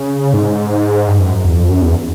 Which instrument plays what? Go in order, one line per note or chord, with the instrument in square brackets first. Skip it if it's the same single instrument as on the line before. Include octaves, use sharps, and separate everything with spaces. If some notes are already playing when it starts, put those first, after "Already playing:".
Already playing: [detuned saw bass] C#3
G#2
G2
F#2
E2
F2
F#2
E2